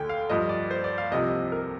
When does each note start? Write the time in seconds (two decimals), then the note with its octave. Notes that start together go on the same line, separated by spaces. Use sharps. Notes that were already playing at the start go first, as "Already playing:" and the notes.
Already playing: D2 D3 G5 G#5
0.09 F5
0.29 G2 F3 D#5
0.49 D5
0.71 C5
0.84 D5
0.98 F5
1.11 C2 C3 F3 D#5
1.52 A#4